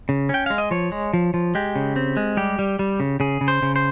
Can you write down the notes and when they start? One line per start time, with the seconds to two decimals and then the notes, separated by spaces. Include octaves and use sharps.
0.09 C#3
0.29 C#4 G5
0.46 G#3 F5
0.58 D#5
0.71 F3 C#5
0.92 G#3
1.13 F3
1.34 F3
1.55 G#3 G4
1.76 C#3
1.96 C4
2.17 G#3
2.37 G3 G4
2.59 G3
2.79 G3
3.00 C#3
3.20 C#3 G#4
3.41 C#3
3.48 C5
3.62 C#3
3.76 C5